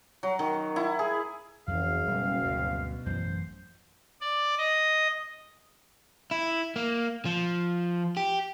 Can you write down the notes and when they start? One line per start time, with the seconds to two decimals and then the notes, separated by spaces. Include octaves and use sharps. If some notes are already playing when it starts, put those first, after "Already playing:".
0.23 F#3
0.39 D#3
0.76 E4
0.99 G#4
1.68 F#1 F2 E3 F5
2.08 B2 F#3 G3 C#4
2.42 D2 G2
3.06 A1 F#2 E3 C5
4.21 D5
4.58 D#5
6.31 E4
6.76 A#3
7.25 F3
8.17 G4